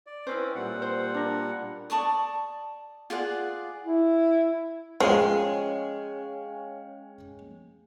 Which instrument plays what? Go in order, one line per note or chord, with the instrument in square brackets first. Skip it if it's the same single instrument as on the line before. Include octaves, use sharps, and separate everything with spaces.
[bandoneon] D5
[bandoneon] C4 C#4 [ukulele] E4 B4 C5
[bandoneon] A#2 G3 F#5
[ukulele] C5
D4 A#4
[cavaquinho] D5 A5 C#6 D#6
F4 G#4 D5 F#5
[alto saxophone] E4
[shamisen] F3 [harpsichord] G#3 G#4 [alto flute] C#4 [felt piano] C#5 F5 G5